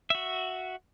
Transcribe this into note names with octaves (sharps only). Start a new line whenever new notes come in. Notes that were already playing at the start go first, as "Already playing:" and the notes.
F#4 E5